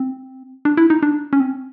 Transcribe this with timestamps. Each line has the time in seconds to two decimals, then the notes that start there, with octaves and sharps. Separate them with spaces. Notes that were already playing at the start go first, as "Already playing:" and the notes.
Already playing: C4
0.65 D4
0.77 E4
0.90 D#4
1.03 D4
1.33 C#4
1.40 C4